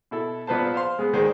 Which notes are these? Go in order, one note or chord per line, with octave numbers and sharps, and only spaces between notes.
B2 E4 A4
A#1 F3 B3 B4 C5 A5
C5 F5 C6
G#3 B3
D2 D#3 G#3 C5